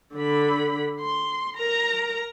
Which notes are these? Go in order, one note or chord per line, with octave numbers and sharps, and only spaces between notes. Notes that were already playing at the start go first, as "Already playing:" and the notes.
D3 B5
C6
A#4 A#5